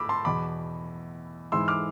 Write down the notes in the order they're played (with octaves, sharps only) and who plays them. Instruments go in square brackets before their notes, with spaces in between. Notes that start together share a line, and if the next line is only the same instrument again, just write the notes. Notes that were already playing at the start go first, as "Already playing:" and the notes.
Already playing: [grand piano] A2 B5 D6 E6
A5 C6
E2 B2 B5 D6
G#2 E3 C6 E6
D6 F6